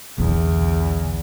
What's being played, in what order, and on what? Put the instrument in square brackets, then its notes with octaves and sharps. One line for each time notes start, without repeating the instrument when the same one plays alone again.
[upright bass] B1 D3 [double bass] E2